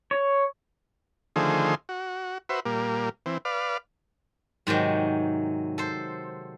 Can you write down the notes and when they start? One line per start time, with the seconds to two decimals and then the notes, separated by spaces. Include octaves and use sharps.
0.11 C#5
1.36 D3 D#3 F3 A3 G#4 C5
1.89 F#4
2.49 F#4 B4 C5 E5
2.65 A#2 G3 A#3
3.26 E3 C4
3.45 B4 D5 F5
4.67 G#2 C3 D#3 F#3
5.78 A4 C5